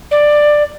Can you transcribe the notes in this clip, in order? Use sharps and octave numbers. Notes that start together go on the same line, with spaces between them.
D5